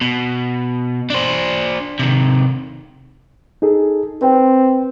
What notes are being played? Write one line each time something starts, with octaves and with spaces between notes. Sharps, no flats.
B2
D4 C5
C3 D#3
D#4 G#4 A4
C4 B4 G5